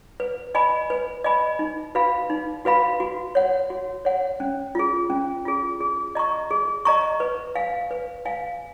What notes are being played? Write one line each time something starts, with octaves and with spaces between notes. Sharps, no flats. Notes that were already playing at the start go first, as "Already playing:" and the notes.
B4
D#5 G#5 B5
B4
D#5 G#5 B5
D#4
F#4 B4 F5 B5
D#4
F#4 B4 F5 B5
F#4
C#5 F#5
F#4
C#5 F#5
C#4
F4 G#4
C#4
F4 G#4
G#4
D#5 A#5 C#6
G#4
D#5 A#5 C#6
B4
F5 G#5
B4
F5 G#5